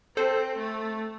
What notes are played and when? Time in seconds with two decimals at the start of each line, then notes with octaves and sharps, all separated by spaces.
0.17 C4 A4 C5
0.58 A3